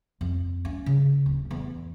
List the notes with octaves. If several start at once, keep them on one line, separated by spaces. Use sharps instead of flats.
F2
C#4
C#3
D1
E2